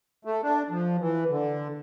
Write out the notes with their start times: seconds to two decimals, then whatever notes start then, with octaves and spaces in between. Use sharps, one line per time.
0.25 A3
0.43 D4
0.70 F3
1.01 E3
1.30 D3